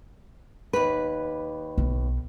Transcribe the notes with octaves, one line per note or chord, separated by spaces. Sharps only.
D#2 B4
B1